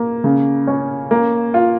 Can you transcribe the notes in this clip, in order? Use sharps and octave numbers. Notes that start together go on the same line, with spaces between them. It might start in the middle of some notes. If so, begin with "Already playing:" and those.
Already playing: A#3
C#3
C#4
A#3
F4